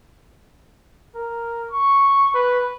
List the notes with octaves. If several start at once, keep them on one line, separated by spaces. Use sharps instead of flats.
A#4
C#6
B4